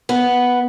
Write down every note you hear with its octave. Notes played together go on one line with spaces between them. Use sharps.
B3